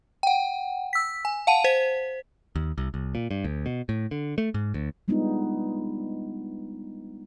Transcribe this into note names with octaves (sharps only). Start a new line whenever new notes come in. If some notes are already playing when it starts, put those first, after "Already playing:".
F#5 G5
E6 B6
G#5
F5 F#5 A5 D#7
C5 B6
D#2
C2
C2
A#2
G2
D2
B2
A2
D3
A3
G#2
D2
G3 G#3 B3 D4 D#4 F4